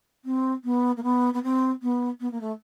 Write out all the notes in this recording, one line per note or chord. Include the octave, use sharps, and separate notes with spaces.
C4
B3
A#3
B3
B3
C4
B3
B3
A#3
A3